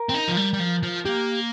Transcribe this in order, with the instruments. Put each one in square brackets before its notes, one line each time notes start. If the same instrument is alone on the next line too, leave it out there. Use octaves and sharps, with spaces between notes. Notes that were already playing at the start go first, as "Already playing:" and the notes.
Already playing: [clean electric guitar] A#4
[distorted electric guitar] C4
D#4
F3
G3
G3
F3
F3
[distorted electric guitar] A#3 [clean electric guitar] G4